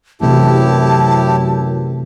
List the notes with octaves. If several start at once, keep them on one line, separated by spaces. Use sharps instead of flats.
F#2 C3 E3 A3 E4 G4 A5